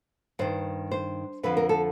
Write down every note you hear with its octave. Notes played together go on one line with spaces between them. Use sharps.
G2 D#3 C5
C5
F2 D3 F3 B4
A#4
A4